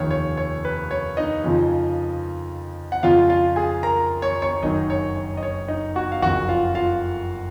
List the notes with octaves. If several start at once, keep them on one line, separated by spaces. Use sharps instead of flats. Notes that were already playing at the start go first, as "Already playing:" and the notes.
Already playing: F1 D#2 D#3 C#5
C#5
C#5
B4
C#5
D#4 D#5
F2 C#3 F3
F#5
F2 C#3 F3 F4 F5
F4 F5
G#4 G#5
A#4 A#5
C#5 C#6
C#5 C#6
F#1 F#2 D#3 F#3 D#4 D#5
C#5
C#5
D#5
C#5
D#4 D#5
F#4 F#5
F5
F#1 F2 C#3 F#4 F#5
F4 F5
F4 F5